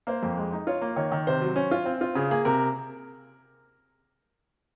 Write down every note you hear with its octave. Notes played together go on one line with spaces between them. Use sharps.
A#3 C5
F2
G#3
D#4
F4 C#5
A#3
D#3 C#5
D#3
C3 C5
F#3
C#4
F4
C4
F4
C#3 G#4
A#3 G#4
C3 A#4